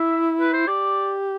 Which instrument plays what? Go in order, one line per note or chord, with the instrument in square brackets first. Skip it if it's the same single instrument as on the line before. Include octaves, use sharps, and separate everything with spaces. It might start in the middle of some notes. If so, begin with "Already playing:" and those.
Already playing: [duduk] E4 [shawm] E5
[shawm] B4
C5
[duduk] G4 [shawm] D5